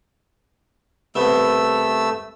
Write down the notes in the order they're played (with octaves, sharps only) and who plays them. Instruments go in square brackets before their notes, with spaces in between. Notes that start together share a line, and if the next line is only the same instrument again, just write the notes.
[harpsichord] C2 B3 [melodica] A3 E6